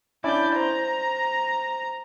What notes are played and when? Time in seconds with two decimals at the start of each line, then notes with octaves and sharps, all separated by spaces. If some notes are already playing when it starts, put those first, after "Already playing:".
0.24 C#4 D4 E4 D5 G6
0.56 C5 A#5